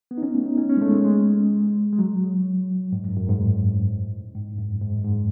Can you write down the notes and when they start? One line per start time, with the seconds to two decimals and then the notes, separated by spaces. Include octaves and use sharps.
0.11 B3
0.18 D#4
0.23 C#4
0.34 A3
0.46 D#4
0.58 C#4
0.69 C#4
0.77 G#3
0.81 A3
0.94 G#3
1.04 G#3
1.92 G#3
1.99 F#3
2.92 G#2
3.05 F#2
3.16 F#2
3.29 G#2
3.40 A2
4.35 G#2
4.58 F#2
4.81 G#2
4.98 F#2
5.05 G#2